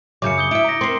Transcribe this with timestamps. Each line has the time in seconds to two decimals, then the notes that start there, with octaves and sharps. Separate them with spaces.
0.22 F#2 C#3 F#3 D6 G6 C#7
0.38 D#6 G6 G7
0.51 E4 E5 D#6 D7
0.64 A#5 A#6
0.81 C4 A#4 C6 C7